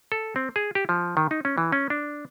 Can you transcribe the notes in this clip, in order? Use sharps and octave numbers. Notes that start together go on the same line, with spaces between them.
A4
C4
G#4
G4
F3
D#3
D#4
C#4
E3
C#4
D4